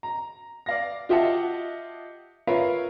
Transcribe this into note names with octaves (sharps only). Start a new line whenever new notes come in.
A#5
D5 F5 A#6
F4 G4 D#5 E5 F#5 A5
F4 A#4 B4 C#5 E5 F5